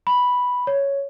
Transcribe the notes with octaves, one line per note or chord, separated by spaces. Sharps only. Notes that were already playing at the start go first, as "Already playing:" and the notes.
B5
C#5